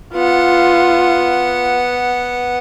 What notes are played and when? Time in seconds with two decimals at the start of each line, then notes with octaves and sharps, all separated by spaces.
0.14 B3 F4 F#5